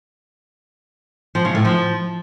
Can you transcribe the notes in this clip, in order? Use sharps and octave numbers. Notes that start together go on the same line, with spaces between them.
F3
C#3
A2
F3